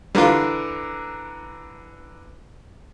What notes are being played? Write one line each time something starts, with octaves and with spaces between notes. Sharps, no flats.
D3 E3 G3 F4 A#4